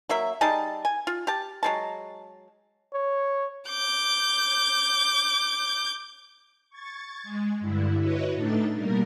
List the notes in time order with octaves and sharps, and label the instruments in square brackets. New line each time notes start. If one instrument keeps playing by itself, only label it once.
[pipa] F#3 A#3 E5
G3 D#4 G#4 A5
G#5
F4
G4 A5
F#3 G#3 A5
[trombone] C#5
[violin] D6 G6
[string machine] C#6 G#6 A6
G#3
G2 D3 E4
E4 F#4 B4 C#5 D#5
A2 A3 D4 D#4 A6
B2 G3 A#3 A#4